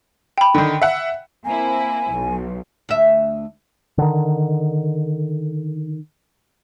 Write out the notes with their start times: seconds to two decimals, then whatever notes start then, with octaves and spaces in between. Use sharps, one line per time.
0.38 G5 B5
0.55 D3 D#3
0.82 E5 F#5
1.45 A#3 C4 E4 G#5
2.11 B1 B2
2.89 D2 E5
3.98 D3 D#3